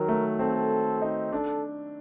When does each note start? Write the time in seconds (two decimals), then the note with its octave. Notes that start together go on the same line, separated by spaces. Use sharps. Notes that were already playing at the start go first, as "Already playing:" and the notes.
Already playing: D#3 F#3 A#4
0.08 A3
0.39 C4 A4
1.02 D#4
1.32 D4 A4